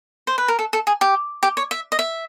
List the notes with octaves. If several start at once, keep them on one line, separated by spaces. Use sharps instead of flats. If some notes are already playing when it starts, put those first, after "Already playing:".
C5
B4
A#4
A4
A4
G#4
G4
G4
C#5
E5
D#5
E5